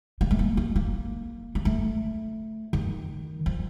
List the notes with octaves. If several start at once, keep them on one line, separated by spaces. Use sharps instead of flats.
A#3
A3
A#3
A#3
A#3
A#3
A3
D#3
F3